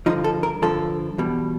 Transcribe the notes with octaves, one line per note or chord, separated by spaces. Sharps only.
G2 D3 F3 D#4
A4
A#4
G2 D3 F3 A4
E2 B2 G3